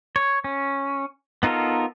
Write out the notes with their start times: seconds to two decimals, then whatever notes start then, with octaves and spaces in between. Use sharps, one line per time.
0.16 C#5
0.44 C#4
1.43 B3 D#4 F4 A4 A#4